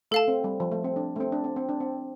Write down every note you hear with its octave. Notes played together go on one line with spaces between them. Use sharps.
A3 A4 F5 A5
C4
G3
F3
A3
C4
D4
A3
C4
D4
C4
C4
D4
C4